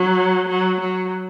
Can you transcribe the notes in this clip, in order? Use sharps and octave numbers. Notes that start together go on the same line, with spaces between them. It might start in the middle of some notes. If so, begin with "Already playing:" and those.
Already playing: F#3
F#3
F#3